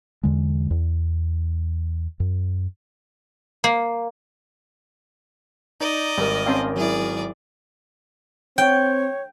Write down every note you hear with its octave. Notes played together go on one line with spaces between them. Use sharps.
E2 D3 G#3
E2
F#2
A#3
D#4 D5 D#5
G#1 G3 A#4
C4 C#4 F5 G5 A5 C6
F#3 E4 G#4 D5
C4 C#5 G5